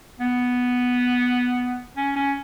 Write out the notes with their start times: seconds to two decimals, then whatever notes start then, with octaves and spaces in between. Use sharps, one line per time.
0.20 B3
1.97 C#4
2.16 C#4